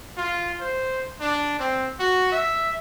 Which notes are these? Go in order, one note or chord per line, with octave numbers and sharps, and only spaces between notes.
F4
C5
D4
C4
F#4
E5